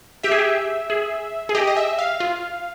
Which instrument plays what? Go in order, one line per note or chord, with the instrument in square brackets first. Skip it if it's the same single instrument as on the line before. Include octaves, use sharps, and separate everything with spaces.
[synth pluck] G4 [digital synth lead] E5
[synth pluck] G#4
G4
G#4
G#4
[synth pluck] G4 [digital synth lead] D#5
[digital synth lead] D#5
E5
F5
[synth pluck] F4